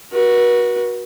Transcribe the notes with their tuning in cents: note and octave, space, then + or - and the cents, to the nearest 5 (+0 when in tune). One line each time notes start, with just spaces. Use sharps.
F#4 +0 B4 -40